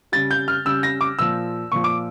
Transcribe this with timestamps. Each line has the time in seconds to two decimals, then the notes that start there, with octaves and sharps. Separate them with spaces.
0.12 C#3 G3 A6
0.31 G6
0.48 F6
0.65 C#3 G3 E6
0.83 A#6
1.01 D6
1.19 A#2 F3 E6
1.72 A#2 F3 C#6
1.84 D6